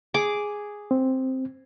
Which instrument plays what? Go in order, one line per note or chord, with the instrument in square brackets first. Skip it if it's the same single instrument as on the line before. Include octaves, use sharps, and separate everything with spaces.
[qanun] G#4 D6
[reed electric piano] C4